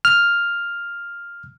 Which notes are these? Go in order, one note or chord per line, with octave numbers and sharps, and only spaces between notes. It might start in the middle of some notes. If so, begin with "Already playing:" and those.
F6